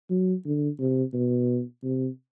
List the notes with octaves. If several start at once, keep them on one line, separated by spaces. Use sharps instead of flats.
F#3
D3
C3
B2
C3